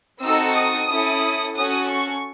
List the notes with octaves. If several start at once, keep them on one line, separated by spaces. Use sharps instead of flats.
C4 D#4 F#4 A4 E6
D#6
C#4 E4 A4
C#4 F#4 A4 D#6
C#6